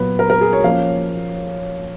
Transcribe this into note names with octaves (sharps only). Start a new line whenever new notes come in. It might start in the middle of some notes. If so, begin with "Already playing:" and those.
Already playing: A#2 F#3 B3 B4
A#4
A#4
G#4
C#5
F3 A#3 C#4 F5